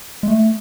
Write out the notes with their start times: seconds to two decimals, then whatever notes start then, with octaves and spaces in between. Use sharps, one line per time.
0.23 G#3
0.27 A3